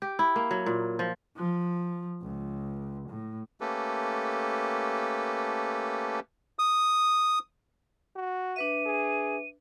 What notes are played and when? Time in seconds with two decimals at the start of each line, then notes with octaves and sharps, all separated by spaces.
0.02 G4
0.19 E4
0.36 A#3
0.51 F#3
0.66 A#2
0.99 F3
1.36 F3
2.22 C#2
3.09 A2
3.61 A3 A#3 C#4 G4 A4 B4
6.59 D#6
8.16 F#4
8.56 D4 B4 E5 D#7
8.86 G#4